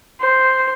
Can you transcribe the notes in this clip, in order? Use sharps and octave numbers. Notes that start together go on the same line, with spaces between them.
C5